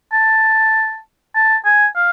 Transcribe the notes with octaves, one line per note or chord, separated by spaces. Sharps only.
A5
A5
G#5
F5